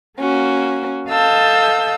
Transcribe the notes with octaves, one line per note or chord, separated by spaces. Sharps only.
A#3 C#4 F#4
A4 D#5 F5 A5 E6 G6